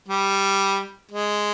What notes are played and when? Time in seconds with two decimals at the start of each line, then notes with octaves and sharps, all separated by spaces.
0.08 G3
1.11 G#3